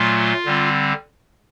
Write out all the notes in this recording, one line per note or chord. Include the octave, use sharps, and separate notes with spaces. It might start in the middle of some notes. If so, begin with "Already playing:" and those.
Already playing: A#2 F#3 A3 F4
D3 G3 C4